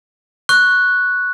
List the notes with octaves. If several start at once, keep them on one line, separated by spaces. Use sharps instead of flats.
C#6 F#6